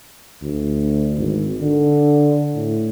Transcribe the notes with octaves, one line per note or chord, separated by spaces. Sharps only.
D2
G#1
D3
A2